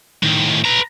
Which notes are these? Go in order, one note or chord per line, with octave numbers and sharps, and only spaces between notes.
A2 D#3
B4 A#5